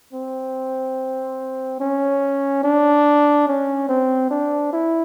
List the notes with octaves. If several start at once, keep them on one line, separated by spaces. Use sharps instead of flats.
C4
C#4
D4
C#4
C4
D4
E4